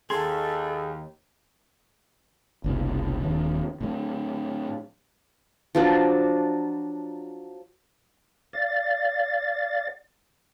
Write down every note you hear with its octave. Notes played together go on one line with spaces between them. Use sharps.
D#2 G#4 A4 C6 G#6 C7
F#1 C2 B2
D#1 D#2 F#3
A2 F#3
F3 F#3 D4
D5 F5 A6